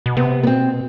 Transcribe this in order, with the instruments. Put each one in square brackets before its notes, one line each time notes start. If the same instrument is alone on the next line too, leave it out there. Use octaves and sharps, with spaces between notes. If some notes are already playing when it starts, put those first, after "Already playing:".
[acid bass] B2
[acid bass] C3 [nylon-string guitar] B3
[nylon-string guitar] B3
[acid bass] B2 [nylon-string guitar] C4